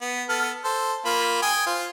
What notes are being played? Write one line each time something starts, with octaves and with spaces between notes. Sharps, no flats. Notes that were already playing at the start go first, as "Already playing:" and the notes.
B3
B3 A4 F6
A4 C5
A#3 F4 B5
G5 G#5 D#6
F4 C5